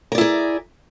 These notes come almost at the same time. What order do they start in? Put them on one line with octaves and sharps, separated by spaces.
A#4 D5 E4 G#4